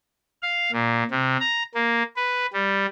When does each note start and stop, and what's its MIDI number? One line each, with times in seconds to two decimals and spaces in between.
0.42 0.71 77
0.72 1.03 46
1.11 1.37 48
1.41 1.63 82
1.74 2.03 58
2.16 2.46 71
2.53 2.86 55